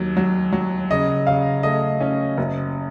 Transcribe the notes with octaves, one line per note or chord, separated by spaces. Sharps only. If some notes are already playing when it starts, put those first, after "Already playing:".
Already playing: D#2 F#3
F#3
F#3
C#3 D#5
C#3 F5
A3 D#5
C#4
F#1